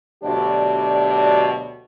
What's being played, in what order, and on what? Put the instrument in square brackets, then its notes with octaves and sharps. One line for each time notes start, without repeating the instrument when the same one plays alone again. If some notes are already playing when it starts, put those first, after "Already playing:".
[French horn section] D2 B2 F#3 D4 G4 D5